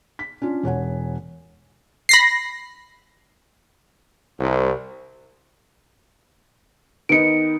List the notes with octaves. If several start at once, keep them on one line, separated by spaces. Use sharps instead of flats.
B6
C#4 D4 F4
E1 C#5 F#5 G#5
B5 A#6 C7
C2
D#3 B3 D#4 C#7 D7